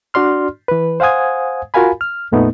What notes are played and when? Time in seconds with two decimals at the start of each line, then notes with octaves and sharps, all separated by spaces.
0.14 D4 F#4 D5 C6 F6
0.68 E3 B4
1.00 C5 F5 F#5 G#5 D#6 G#6
1.74 F4 F#4 A#4 F5 G#5 B5
2.01 F6
2.32 F2 A#2 A3 B3 D#4